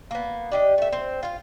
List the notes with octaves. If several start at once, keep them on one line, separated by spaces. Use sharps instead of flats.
A#3 B3
D4 G4 D#5
A3 E5
C4
F4 F5